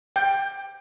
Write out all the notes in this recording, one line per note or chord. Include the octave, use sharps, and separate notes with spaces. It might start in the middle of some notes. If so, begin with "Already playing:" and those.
G5